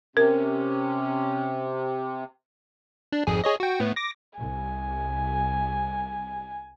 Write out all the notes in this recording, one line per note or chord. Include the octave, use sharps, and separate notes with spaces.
C3 C#4 A#4
D4
G#1 F2 G#4
G#4 C#5 D#5
F#4 G5
A2 B3
D6 A#6
C2 G#5